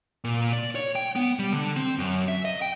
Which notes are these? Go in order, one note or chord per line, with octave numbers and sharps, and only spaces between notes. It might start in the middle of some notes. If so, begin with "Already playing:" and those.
A#2
D5
C#5
G5
B3
G3
D3
C4
F#2
E5
D#5
G5